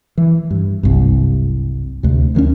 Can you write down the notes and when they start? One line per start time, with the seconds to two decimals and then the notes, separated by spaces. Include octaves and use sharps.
0.18 E3
0.51 G2
0.83 F#1 C2 G2
2.03 D2 C3
2.35 D2 D#3 G#3 C#4